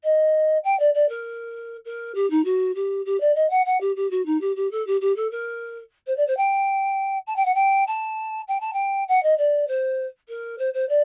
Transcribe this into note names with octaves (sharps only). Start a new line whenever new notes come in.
D#5
G5
D5
D5
A#4
A#4
G4
D#4
F#4
G4
G4
D5
D#5
F#5
F#5
G4
G4
F#4
D#4
G4
G4
A4
G4
G4
A4
A#4
C5
D5
C5
G5
A5
G5
F#5
G5
A5
G5
A5
G5
F#5
D#5
D5
C5
A#4
C5
C5
D5